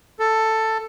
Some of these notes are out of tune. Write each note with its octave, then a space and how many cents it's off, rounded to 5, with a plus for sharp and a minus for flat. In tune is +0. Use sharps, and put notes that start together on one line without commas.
A4 +10